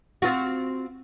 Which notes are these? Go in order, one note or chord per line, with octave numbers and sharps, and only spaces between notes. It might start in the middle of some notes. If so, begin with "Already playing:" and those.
C4 F4 F#4